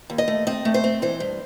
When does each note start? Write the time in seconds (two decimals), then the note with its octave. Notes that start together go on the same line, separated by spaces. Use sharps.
0.10 D#2
0.18 D#5
0.28 A3
0.47 C4 D#5
0.65 A3
0.74 C5
0.84 C4
1.02 E3 C5
1.20 G2